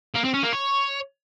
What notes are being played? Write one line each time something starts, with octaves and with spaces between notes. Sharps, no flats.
A#3
C4
C#4
A#3
C#5